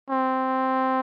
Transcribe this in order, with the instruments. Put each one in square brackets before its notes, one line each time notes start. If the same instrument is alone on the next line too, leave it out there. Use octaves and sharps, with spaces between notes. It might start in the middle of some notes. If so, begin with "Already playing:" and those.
[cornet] C4